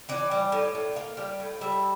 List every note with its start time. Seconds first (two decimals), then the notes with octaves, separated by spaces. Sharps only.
0.09 E3 D5
0.31 G3
0.52 A2
0.75 A2
0.96 A#3 F5
1.17 G3
1.40 A2
1.61 G3 E5